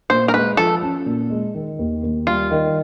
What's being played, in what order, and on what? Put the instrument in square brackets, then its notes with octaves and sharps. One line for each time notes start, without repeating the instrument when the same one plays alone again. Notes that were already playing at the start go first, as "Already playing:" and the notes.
[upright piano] A#2 [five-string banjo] C5
[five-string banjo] A#4
[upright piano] G#3 [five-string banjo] B4
[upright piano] F3 [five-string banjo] A4
[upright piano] C#4
A#2
G#3
D#3
D#2
D#2
[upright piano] G3 [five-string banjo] F4
[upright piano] D#3